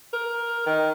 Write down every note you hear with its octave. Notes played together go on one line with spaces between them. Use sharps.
A#4
D#3